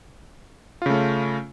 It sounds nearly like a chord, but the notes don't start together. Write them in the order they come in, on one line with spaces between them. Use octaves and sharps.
F4 C#3 A3 C#4